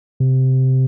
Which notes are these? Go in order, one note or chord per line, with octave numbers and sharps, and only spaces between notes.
C3